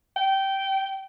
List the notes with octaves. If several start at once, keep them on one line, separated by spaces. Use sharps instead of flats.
G5